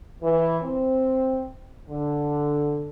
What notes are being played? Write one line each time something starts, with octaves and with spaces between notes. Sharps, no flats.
E3
C4
D3